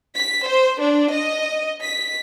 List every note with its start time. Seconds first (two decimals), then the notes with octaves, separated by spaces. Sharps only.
0.17 B6
0.47 C5
0.82 D4
1.14 D#5
1.82 B6